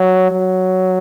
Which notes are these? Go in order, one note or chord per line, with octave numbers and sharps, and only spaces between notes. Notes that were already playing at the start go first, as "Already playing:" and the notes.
Already playing: F#3
F#3